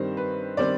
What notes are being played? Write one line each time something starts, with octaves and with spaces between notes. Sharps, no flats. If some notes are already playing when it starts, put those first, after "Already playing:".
Already playing: G2 D#3 G3 C4 C5
B4
D#3 G3 C4 D5